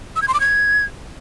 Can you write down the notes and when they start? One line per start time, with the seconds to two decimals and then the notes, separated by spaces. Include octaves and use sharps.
0.16 E6
0.22 G#6
0.28 C6
0.34 D6
0.40 G#6